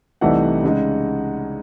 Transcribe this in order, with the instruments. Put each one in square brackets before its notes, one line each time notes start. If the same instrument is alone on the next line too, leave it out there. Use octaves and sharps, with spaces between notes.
[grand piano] C2 C3 E3 A3 D#4 F#5
C#3 G#3 D#4